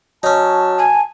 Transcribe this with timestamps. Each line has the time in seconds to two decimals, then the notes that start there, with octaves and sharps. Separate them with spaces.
0.23 F#3 C#4 D#4 A5
0.78 G#5